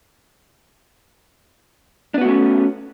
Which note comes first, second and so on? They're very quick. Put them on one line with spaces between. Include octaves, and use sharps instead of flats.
D4 B3 F#4 A3 C#4